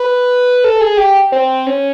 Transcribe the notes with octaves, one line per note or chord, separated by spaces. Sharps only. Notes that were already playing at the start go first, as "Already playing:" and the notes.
Already playing: B4
A4
G#4
G4
C4
C#4